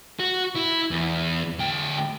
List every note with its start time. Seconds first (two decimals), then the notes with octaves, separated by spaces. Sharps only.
0.20 F#4
0.56 E4
0.91 E2
1.59 D2 G5